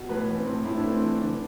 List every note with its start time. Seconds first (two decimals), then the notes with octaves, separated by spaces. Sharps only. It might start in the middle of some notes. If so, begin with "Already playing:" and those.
Already playing: B2
0.09 A2 B4
0.28 E3
0.37 C4
0.46 A2
0.65 A2 E4
0.76 D4
0.84 A3 C4
0.99 E3 D4
1.21 D3 D4